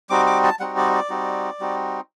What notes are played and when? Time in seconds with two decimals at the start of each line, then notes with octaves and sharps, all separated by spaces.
0.10 G3 C4 D#4 F#4 D6
0.26 D6
0.44 A5
0.60 G3 C4 D#4 F#4 F#5
0.77 D5
0.94 D5
1.10 G3 C4 D#4 F#4
1.60 G3 C4 D#4 F#4